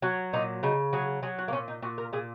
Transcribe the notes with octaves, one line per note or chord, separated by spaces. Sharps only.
F#3 F#4
A#2 D#4
C#3 D#4
F#3 G#4
F#3 G#4
F#4
A#3
A#2 C#4
D#4
A#2 F#4
A#4
A#2 G#4